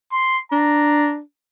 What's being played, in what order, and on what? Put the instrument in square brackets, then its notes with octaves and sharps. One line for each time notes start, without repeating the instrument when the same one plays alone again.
[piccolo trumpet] C6
[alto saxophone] D4 [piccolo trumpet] A#5